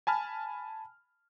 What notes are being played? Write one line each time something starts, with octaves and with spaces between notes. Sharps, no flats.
G#5 A5 B5 F6